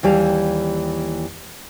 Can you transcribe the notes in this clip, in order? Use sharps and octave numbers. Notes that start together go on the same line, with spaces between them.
D#2 E3 G3 F5